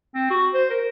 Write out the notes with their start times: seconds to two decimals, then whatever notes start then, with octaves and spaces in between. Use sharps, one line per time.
0.15 C4
0.30 F#4
0.54 C5
0.70 A#4